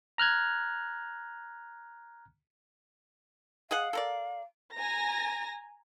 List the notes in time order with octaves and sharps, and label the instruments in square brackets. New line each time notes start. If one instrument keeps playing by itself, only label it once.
[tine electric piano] A#5 F6 F#6 G#6
[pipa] G#4 D#5 F#5 [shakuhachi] F5
[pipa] A4 A#4 D5
[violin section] G#5 A#5 A#6